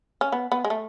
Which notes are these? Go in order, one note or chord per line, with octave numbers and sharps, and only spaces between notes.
C#4
B3
B3
G#3
A3